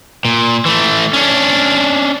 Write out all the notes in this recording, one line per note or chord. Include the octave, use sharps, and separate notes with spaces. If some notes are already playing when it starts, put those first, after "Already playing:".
A#2
E3 A3
C#4 D4